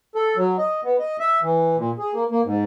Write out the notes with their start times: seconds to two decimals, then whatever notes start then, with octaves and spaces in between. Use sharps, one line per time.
0.15 A4
0.37 F#3
0.58 D#5
0.84 B3
0.99 D#5
1.20 E5
1.43 E3
1.77 A#2
1.98 G#4
2.14 A#3
2.31 A#3
2.45 G#2